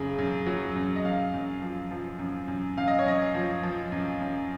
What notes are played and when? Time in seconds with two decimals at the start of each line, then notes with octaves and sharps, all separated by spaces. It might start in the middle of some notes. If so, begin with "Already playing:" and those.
Already playing: F#2 C#3
0.18 F#2
0.46 F#3
0.76 F#2
0.96 D#5
1.05 F#2 F5
1.34 F#2
1.62 F3
1.91 F3
2.19 F#2
2.48 F#2
2.77 F#2 F5
2.88 D#5
2.99 C#5
3.06 F#2 D#5
3.34 F3
3.63 F3
3.92 F#2
4.21 F#2